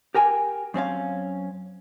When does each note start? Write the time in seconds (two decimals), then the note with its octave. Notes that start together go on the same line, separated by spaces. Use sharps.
0.14 G4 A#4 G5 G#5
0.74 F#2 C4 C#4 F5